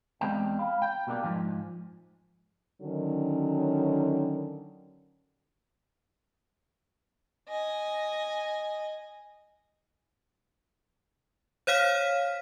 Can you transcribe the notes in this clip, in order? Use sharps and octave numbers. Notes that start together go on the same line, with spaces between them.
E2 G2 G3 G#3 C4 G5
F5 B5
G5
B2 G3 A#3 D4 G4
G#2 F3 G#5
D3 D#3 F#3 C#4
D#5 G#5
C5 C#5 F5 F6 B6